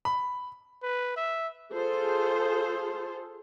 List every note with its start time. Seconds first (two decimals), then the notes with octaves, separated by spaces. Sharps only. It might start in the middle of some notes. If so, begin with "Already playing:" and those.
0.05 B5
0.83 B4
1.16 E5
1.74 F4 G#4 A4 C5